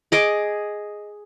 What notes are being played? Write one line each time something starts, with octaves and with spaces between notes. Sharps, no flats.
G#4 D#5 D6